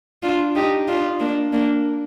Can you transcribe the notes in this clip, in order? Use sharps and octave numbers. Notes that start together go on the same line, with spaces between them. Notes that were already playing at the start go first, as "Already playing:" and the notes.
D4 F4
D#4 G4
D4 F4
A#3 D4
A#3 D4